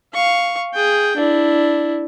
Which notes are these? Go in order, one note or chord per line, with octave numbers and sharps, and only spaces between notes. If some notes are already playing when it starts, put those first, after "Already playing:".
F5 C#6
G#4 G5
D4 E4